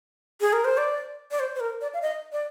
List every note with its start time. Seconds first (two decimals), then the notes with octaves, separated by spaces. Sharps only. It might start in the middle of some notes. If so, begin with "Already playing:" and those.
0.41 G#4
0.53 A#4
0.64 C5
0.77 D5
1.31 D5
1.40 C5
1.55 C5
1.60 A#4
1.81 D5
1.94 F5
2.02 D#5
2.32 D5